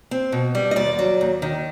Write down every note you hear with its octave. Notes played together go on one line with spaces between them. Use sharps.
C4
B2
G3
D#5
D#2 D5
F#3
D#2
D#3